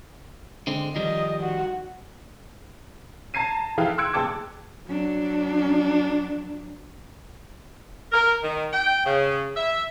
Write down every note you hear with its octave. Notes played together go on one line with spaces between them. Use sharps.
D3 G#3 C4
D#3 F3 G3 D#5
F#4
A5 A#5 G#6 C7 D#7
E3 E4 G#4 A4 F5 G5
C6 E6 F#6 G#6 C#7 D7
F#1 G#4 G5 A5 D6 G#6
F#3 D4
A#4
D#3
G5
C#3
E5